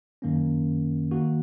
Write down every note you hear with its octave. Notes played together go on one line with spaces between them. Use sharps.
F#2 D#3 A#3 C#4
D#3 A#3 F#4